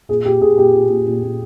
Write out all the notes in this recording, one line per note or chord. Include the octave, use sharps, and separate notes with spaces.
A#2 G#4
A#2 G4
A#2 G#4
A#2 G4
A#2
A#2
A#2
A#2